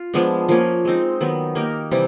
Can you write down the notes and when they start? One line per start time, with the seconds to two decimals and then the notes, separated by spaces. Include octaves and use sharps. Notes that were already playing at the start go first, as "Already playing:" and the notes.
Already playing: F4
0.14 F3 G#3 B3 D4
0.49 F3 A#3 C#4
0.85 G#3 C4 D#4
1.21 D#3 F#3 B3
1.55 A#3 D#4 G4 A#4
1.91 C3 E3 G3